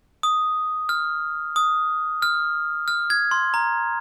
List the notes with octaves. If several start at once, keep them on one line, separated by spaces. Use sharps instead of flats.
D#6
F6
D#6
F6
F6
G#6
C6
A#5